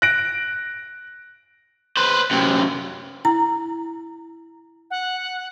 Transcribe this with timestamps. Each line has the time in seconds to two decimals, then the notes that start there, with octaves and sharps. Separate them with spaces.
0.02 F#6 A#6 D7
1.97 B4 C5
2.31 F#2 C3
3.25 E4 A#5
4.91 F#5